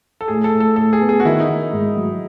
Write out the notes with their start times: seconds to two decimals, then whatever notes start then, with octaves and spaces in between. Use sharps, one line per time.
0.21 A4
0.28 A2 G#4
0.44 A4
0.53 A2
0.60 A4
0.76 A2 A4
0.93 G#4
1.01 B3
1.09 G#4
1.20 F#4
1.25 D#3 E4
1.40 D#4
1.48 D#3
1.73 G#2
1.96 F#3